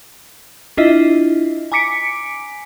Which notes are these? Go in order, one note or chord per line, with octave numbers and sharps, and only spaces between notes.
D4 E4 F4 D#5 E5
G#5 A#5 D6 B6 C#7 D7